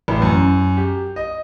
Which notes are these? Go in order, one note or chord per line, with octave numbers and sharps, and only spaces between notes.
A1
F#2
G4
D#5